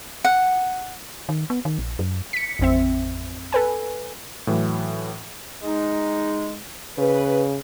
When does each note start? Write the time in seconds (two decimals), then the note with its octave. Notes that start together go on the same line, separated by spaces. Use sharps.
0.24 F#5
1.29 D#3
1.50 B3
1.65 D#3
1.78 A#1
1.99 F#2
2.33 B6 C#7
2.59 A1 F2 C4 E5
3.53 A4 B4 G#5
4.47 A2 E3 F#3
5.63 G#3 D#4
6.98 C#3 B4